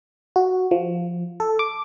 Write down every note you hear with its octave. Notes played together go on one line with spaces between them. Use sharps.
F#4
F3
A4
D6